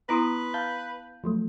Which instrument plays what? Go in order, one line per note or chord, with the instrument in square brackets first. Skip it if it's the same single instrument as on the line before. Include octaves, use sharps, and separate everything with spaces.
[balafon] B3 E4 [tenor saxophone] B4 [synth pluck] A#5 C6 D#6
[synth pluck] F5 A5 G6
F3 F#3 A3